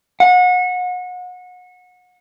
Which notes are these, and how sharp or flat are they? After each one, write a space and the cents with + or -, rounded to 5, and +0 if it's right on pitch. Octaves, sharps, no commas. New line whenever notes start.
F#5 -30